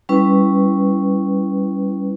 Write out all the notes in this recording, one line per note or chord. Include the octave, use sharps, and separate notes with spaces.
G3 C#4 E4 B4